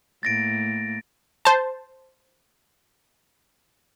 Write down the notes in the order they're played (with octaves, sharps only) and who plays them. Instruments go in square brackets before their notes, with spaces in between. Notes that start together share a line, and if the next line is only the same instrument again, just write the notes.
[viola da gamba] A2 A#3 [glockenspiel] A6 A#6 D7
[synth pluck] C5 A5